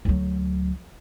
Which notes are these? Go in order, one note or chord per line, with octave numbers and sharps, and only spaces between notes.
D2 F#3